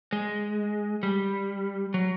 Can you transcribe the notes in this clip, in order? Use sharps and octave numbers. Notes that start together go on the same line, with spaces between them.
G#3
G3
F#3